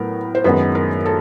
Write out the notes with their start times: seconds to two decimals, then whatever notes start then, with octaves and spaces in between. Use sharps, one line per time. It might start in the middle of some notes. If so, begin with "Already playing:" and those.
Already playing: A2 F#3 B3 A#4
0.35 C5
0.44 F#2 D#3 G#3 B3 B4
0.75 A#4
1.06 A4